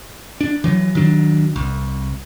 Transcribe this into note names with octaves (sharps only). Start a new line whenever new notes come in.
D4
E3 F#3
D#3 F#3 D4
C2